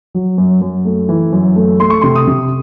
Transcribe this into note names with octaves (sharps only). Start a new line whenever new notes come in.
F#3
F#2
F#2
A3
E3
F#2
A3
A3 C6
C#6
C3 C6
D#6
C3